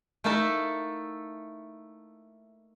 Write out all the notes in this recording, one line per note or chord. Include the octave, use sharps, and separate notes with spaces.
A3 A#3 D#4 E4 A4 A5